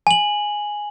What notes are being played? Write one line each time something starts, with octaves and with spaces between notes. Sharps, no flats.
G#5 F#7